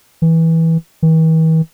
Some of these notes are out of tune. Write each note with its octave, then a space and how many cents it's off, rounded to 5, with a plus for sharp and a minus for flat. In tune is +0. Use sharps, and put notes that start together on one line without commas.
E3 -15
E3 -45